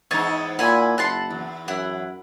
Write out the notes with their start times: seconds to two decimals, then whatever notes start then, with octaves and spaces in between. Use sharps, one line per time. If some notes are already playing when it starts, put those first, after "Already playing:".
0.11 E2 G#2 D#4 C#5 D#5 A5
0.59 A#2 E4 F#5 G#5 B5
0.98 F#1 F#5 A5 C6
1.30 E2
1.68 F#2 E4 F#5